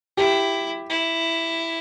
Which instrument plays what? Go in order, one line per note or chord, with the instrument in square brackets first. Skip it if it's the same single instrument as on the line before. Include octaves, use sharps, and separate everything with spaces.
[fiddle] E4 [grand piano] G4
[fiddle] E4